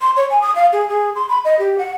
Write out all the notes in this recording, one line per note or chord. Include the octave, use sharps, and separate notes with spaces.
C6
C#5
G#5
D#6
F5
G#4
G#4
C6
B5
D#5
G4
F#5